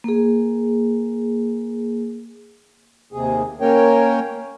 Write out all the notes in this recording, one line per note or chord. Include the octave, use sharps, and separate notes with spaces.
A#3 G#4
D#2 C3 G#4
A#3 C#4 A#4 C#5 G5